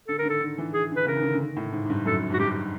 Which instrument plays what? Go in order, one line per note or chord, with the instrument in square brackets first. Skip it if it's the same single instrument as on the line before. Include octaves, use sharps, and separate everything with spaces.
[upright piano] D3 [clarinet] A4
[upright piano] D#3 [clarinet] A#4
[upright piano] D3 [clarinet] A4
[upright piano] D#3
E3
[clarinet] G#4
[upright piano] D3
[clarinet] B4
[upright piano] C#3 [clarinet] A#4
[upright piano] D#3
D3
D3
D#3
A2
G#2
G#2
G2
[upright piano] F#2 [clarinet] A4
[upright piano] G#2 [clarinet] F#4
[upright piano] G2 [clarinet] G4